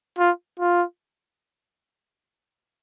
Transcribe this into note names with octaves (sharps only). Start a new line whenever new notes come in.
F4
F4